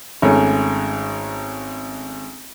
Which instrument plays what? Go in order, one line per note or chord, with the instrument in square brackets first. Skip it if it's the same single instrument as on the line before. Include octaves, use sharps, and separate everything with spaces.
[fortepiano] G#1 G#2 A3 C#4